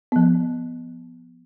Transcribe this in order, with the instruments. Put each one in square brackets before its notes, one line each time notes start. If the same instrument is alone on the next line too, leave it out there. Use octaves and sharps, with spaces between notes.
[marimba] F3 B3